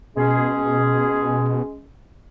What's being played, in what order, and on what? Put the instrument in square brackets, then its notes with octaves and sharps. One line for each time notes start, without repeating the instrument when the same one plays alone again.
[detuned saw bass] B2 [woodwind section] G#3 C#4 G#4